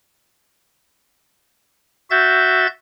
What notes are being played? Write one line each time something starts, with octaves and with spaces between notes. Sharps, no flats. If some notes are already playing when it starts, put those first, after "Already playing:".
F#4 E5 G6 A6